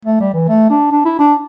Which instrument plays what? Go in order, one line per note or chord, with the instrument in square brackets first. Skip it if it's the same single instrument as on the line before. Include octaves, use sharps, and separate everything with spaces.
[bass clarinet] A3
G3
E3
A3
D4
D4
E4
D4